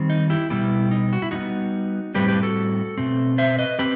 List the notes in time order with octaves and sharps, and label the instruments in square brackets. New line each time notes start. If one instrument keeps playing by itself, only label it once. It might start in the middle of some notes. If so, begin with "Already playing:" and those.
Already playing: [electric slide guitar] D#3 G3 C4
D#4
E4 G4
B2 G3 B3 E4 G4
D#4
F#4
E4
E3 G3 B3 D#4 F#4
A2 G3 C4 G4 B4
G4 B4
F#4 A4
B2 A3 C4
C5 E5
B4 D#5
C4 G4 B4